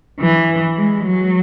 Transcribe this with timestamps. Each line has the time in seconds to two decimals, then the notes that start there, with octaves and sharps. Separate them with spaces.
0.20 E3
0.77 G#3
1.05 F#3